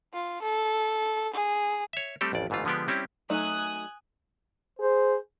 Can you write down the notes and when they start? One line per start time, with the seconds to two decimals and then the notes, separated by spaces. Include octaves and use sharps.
0.13 F4
0.42 A4
1.34 G#4
1.93 C#5 E5
2.21 G3 A3 C4 G4 A4
2.33 A1 F2 D5
2.50 G1 G#2 E3 A3 F4
2.65 D3 F3 G#3 B3 D4 G4
2.88 G3 C4 C#4 E4 G4
3.30 F#3 A3 D#4 G#5 D#6 F#6
4.79 G#4 C5